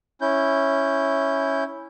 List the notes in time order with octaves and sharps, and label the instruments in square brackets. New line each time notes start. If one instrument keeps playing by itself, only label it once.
[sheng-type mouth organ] C#4 E4 G6